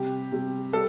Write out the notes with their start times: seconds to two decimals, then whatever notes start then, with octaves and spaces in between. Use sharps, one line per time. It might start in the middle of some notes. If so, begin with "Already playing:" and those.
Already playing: C3 G3 G4
0.32 C3 G3
0.73 G3 A4